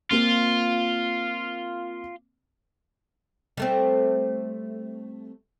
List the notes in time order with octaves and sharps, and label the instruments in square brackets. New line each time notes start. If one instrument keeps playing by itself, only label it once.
[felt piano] A#3 C4 [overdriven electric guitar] F4
[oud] G3 A3 C4